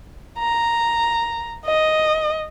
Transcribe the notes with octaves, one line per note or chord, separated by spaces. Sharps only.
A#5
D#5